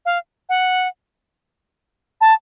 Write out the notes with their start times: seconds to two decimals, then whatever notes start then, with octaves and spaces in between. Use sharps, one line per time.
0.06 F5
0.49 F#5
2.21 A5